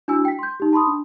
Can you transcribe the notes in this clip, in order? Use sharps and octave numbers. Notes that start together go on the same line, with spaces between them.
D4 E4 F#4 G#5 E6
G5 B6
C6 G6
D#4 G4
A5 B5 C6 D#6
D4